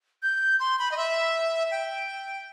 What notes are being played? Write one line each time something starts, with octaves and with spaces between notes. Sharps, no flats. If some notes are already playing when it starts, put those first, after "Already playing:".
G6
C6
B5
D#5
E5
G5